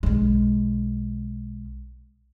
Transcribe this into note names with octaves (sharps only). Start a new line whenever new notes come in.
B1 G#3